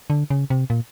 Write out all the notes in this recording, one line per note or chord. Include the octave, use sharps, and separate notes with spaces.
D3
C#3
C3
A#2